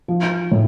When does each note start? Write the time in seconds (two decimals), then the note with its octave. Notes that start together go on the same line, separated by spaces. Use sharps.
0.08 F3
0.51 A2